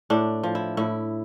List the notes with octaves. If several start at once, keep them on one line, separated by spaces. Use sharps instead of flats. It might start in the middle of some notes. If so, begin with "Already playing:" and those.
A2 D4
F3
E4
A2 E4